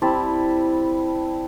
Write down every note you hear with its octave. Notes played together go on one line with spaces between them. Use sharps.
G3 C4 E4 A5